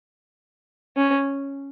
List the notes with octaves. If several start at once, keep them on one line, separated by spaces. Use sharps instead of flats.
C#4